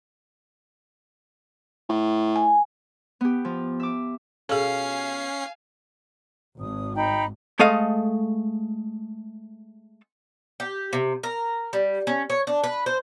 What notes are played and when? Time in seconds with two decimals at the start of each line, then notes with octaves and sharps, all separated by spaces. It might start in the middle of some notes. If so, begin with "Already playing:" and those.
1.89 A2
2.36 G#5
3.21 B3 G4
3.45 F3
3.80 E5 D6
4.49 B2 C#4 F4 G#4 A4 F5 G#5 C7
6.59 G#1 D#6
6.95 D#4 G5 B5
7.59 G#3 A3 A4 D#5 F5
10.60 G4
10.93 C3
11.23 A#4
11.73 G3
12.07 C#4
12.30 C#5
12.47 D4
12.64 B4
12.86 C5